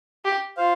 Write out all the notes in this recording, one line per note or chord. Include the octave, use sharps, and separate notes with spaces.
G4
F4 C5 F5